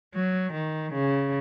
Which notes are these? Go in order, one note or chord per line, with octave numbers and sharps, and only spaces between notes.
F#3
D#3
C#3